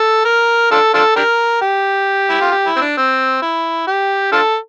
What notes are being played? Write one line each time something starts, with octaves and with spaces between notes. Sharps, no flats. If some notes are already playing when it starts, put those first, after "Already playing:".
Already playing: A4
A#4
D4 F4 A4
D4 F4 A4
D4 G4 A#4
G4
E4
F4
G4
E4
C4
D4
C4
E4
G4
D4 F4 A4